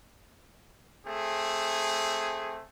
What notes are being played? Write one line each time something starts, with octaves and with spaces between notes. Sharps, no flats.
A3 C4 G#4